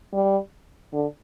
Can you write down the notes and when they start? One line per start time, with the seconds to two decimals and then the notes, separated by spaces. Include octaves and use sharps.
0.13 G3
0.93 D3